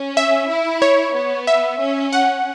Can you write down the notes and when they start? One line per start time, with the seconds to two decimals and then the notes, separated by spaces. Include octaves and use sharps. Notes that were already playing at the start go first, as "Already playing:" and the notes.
Already playing: C#4
0.17 E5
0.49 E4
0.82 C#5
1.15 B3
1.47 E5
1.80 C#4
2.13 F#5